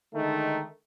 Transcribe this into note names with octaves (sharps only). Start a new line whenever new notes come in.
D3 D#3 G#3 A3 D#4